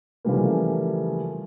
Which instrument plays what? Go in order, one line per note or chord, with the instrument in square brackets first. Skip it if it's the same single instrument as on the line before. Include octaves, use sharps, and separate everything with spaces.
[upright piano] C#3 E3 F3 G3 A3 A#3